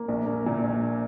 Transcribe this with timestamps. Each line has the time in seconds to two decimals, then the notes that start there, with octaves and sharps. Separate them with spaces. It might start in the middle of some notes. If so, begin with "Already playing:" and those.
Already playing: A#3
0.08 A#1
0.27 A#3
0.46 A#2
0.64 A#1